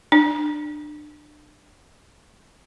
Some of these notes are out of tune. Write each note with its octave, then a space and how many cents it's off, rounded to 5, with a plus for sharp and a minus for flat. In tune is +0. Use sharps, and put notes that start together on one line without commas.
D4 +30